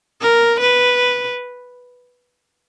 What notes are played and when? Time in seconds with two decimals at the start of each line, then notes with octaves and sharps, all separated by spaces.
0.21 A#4
0.59 B4